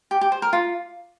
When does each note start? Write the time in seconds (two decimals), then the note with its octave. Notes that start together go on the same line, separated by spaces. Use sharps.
0.11 G4
0.21 G4
0.32 C5
0.42 A#4
0.53 F4